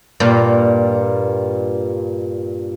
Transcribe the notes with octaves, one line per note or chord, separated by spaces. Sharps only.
G2 A#2